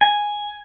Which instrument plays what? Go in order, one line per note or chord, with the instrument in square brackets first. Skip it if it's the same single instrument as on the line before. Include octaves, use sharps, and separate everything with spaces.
[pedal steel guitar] G#5